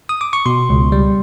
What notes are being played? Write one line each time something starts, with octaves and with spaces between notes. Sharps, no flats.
D#6
D6
C#6
B2 C6
C#2
G3